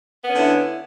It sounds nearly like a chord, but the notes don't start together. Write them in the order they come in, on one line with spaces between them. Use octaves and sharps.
B3 C#4 D3 E4